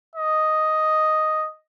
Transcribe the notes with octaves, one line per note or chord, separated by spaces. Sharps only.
D#5